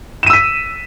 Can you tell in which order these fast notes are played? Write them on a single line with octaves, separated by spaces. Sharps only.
E7 D#7 E6 B6